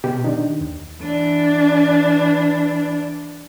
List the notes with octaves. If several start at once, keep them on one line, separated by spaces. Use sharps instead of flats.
B2 G4
D#3 D4 D#4
D#2
E3 D4